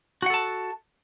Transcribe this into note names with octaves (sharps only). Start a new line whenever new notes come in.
F#4 A4 F#5 A5